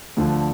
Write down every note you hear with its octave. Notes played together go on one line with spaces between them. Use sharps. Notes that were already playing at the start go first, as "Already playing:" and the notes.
D2 D3 F3 A3